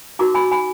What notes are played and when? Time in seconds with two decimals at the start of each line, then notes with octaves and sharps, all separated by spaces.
0.19 D#4 F#4 A#4 A#5 D6
0.35 G#5 B5
0.51 G#5 B5